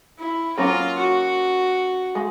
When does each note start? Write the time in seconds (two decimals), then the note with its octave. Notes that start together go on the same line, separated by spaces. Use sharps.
0.19 E4
0.57 F#3 A#3 C#4 F4
0.98 F#4
2.15 G#3